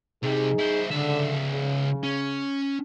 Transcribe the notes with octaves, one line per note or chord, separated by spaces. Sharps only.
C3 G3 D#4 G#4
E4 C5
C#2 D3 E5
C#3
C#4